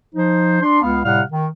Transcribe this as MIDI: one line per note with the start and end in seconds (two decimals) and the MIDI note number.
0.15 0.61 53
0.15 0.61 63
0.15 0.61 72
0.62 0.80 62
0.62 0.80 84
0.83 0.99 37
0.83 0.99 59
0.83 0.99 77
1.04 1.22 45
1.04 1.22 48
1.04 1.22 55
1.04 1.22 77
1.04 1.22 78
1.04 1.22 89
1.31 1.47 51